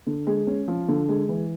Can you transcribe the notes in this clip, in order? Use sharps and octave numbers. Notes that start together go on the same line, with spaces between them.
D3
G#3
C#4
F3
D3
G#3
E3